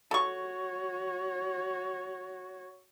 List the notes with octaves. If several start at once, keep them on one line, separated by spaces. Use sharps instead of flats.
F#4 A4 C#5 C#6